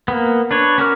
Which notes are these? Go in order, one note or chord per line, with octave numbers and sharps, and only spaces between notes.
A#3 B3
D4 B4 C#5
C#4 F#4 A#4 D6 F6